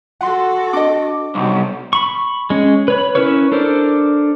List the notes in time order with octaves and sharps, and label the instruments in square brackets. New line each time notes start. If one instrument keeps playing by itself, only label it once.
[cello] F#4 A4 [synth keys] F#5 C6
[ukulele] D4 D#5 [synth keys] D6
[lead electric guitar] B1 [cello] C3 G3
[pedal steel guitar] B5 C#6
G#3 C#4
B4 C#5 B5
C#4 E4 A#4 B4 C#5
D4 A4 A#4 C5 D5